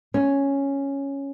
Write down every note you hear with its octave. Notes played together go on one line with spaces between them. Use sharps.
C#4